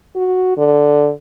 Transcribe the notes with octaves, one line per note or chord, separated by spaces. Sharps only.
F#4
D3